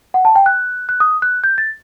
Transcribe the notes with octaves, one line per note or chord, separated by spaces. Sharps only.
F#5
A5
G5
F#6
F#6
D#6
F#6
G6
A6